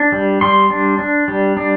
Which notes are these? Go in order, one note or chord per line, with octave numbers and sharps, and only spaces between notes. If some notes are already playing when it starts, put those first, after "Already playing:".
Already playing: D4
G3
G3 C6
D4
D4
G3
D4